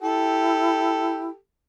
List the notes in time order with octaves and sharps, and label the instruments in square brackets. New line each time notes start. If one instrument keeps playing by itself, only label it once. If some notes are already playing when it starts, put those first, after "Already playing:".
[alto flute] E4 [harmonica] G4 A4